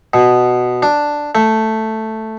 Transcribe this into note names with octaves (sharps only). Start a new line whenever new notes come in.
B2
D4
A3